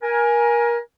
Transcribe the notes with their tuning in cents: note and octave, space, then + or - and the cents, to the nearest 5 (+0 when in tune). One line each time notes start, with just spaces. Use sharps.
A#4 +25 G#5 +0